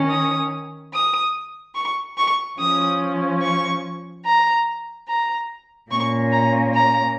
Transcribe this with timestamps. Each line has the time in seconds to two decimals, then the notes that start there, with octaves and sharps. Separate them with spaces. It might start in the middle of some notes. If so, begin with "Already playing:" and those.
Already playing: D#3 C#4
0.09 D#6
0.92 D#6
1.75 C#6
2.17 C#6
2.58 F3 C#4 D#6
3.41 C#6
4.24 A#5
5.07 A#5
5.90 A#2 A#3 C#4 C#6
6.32 A#5
6.73 A#5